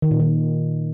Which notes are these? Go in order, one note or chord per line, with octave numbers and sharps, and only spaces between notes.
D#3
A#2
D#3